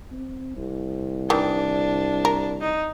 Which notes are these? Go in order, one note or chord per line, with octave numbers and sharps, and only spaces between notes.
C4
C2
D#3 E3 D4
A#4
D#4